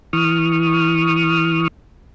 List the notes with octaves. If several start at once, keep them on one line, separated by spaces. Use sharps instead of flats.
E3 C#6 D#6 F6